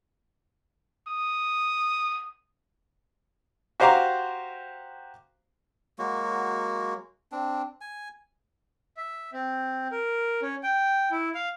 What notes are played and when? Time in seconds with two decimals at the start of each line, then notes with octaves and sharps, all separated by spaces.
1.08 D#6
3.80 F#4 G4 C5 F5 A#5 D6
5.99 F#3 G#3 A#3 F#4
7.32 C4 D4
7.81 G#5
8.97 E5
9.33 C4
9.92 A#4
10.42 C#4
10.63 G5
11.11 E4
11.35 F5